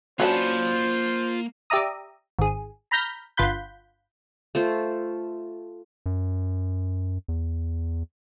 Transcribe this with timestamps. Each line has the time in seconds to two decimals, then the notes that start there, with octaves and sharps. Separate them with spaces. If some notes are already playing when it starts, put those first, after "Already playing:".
0.20 F#3 A#3 C#4 D4 F4 C5 A5 B5
1.70 G4 D5 E5 A#5 D#6
2.39 G#1 G#4
2.91 A#5 B5 F6 G6 A#6 B6
3.37 G1 F4 F#5 B5 G6
4.55 A3 F4 C5
6.06 F#2
7.28 E2